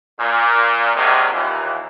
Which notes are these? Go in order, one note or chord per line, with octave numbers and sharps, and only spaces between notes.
A#2
C3 D#3 F#3 G#3 A#3 D4
D#2 A#2 E3